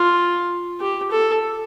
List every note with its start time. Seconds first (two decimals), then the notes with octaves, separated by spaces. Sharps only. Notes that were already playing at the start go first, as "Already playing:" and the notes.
Already playing: F4
0.80 G4
1.11 A4